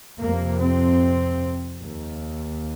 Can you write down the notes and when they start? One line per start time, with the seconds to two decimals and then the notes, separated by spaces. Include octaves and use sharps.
0.18 F2 C3 A#3
0.60 C4
1.81 D#2